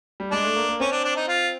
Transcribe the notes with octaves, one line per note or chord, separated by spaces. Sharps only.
G3
G#3 D4
A3
A#3
A#3
C4 C#4
D4
D4
D#4
F4